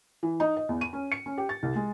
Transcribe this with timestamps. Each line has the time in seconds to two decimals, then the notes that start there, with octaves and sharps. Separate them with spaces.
0.23 E3
0.40 D#4
0.57 D#5
0.69 E2
0.81 D#7
0.93 C#4
1.12 C#7
1.26 C#4
1.38 G4
1.49 A6
1.63 C2
1.75 G#3